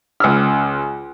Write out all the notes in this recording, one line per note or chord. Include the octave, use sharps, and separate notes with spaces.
C#2 E6 F6